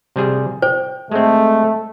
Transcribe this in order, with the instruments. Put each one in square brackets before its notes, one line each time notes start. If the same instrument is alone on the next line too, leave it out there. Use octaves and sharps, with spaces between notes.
[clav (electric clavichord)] C3 G3 G#4
[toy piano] C5 [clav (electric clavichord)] G5
[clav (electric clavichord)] G#3 C4 [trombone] A3